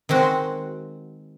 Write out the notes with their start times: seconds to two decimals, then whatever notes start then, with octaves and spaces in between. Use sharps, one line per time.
0.09 D#3 G#3 C4 F#4